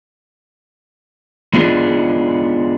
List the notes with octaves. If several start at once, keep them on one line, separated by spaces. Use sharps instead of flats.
G#3 B3 D4 F4 G#4